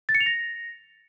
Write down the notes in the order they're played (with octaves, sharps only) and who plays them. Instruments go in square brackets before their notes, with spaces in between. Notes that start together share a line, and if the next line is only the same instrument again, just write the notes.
[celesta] A6
C#7
F7
A#6